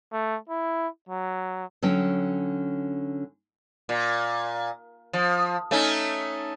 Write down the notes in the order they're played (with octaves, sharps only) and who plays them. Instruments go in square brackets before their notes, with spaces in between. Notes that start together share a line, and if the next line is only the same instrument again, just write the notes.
[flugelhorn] A3
E4
F#3
[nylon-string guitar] D3 F#3 C#4 G5
[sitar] A#2
F3
A3 C#4 D#4